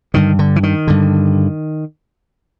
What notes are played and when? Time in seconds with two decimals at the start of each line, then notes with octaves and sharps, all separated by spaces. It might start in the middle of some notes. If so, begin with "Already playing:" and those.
0.14 G2 D3 D#3
0.39 D3
0.56 E3
0.63 D#3
0.87 G2 D3